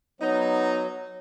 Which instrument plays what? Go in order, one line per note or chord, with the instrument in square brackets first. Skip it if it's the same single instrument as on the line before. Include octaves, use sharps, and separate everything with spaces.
[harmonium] F#3 [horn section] B3 D#4